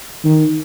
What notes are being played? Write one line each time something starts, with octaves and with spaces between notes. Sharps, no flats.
D#3